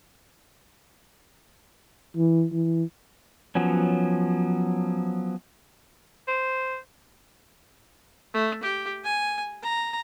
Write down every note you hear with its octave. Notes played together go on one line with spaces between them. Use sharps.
E3
E3
F3 F#3 B3 C#4
C5
A3
G4
G#5
A#5